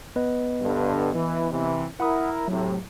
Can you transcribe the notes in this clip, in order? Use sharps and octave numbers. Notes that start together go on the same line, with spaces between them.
B3 B4 D#5
G2 D3
E3
C3 E3
E4 A#4 F#5 B5 D#6
A2 C3 F#3